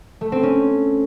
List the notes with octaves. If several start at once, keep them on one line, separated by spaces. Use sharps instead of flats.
A3
C4
C#4